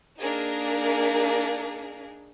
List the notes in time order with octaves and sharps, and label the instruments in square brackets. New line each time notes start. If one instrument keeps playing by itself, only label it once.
[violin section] A#3 D4 D#4 G#4 A#4